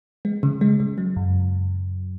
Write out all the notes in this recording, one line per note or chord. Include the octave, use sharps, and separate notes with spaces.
G#3
C#3
G#3
C#3
F#3
F#2